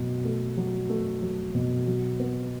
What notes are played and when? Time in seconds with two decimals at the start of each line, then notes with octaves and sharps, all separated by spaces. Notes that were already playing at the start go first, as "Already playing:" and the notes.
Already playing: B2 F#3 A3
0.25 A3
0.57 F#3
0.90 A3
1.22 F#3
1.55 B2
1.87 F#3
2.20 B3